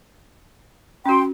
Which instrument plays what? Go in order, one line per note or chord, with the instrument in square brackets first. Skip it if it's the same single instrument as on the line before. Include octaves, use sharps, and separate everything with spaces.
[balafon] C#4 F#4 [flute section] G5 C6